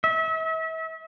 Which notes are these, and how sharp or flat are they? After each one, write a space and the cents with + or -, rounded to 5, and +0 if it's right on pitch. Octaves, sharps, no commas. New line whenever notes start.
E5 -35